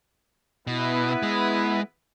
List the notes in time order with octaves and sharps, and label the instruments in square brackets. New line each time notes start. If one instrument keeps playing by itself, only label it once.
[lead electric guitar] B2 [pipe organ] B3 E4 B4
[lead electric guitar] G#3